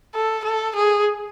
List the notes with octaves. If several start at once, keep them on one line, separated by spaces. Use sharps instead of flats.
A4
A4
G#4